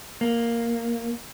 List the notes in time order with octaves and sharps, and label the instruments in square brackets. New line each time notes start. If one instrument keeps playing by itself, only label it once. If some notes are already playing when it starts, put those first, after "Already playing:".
[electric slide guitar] A#3